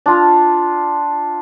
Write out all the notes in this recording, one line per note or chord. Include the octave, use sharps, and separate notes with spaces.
D4 F4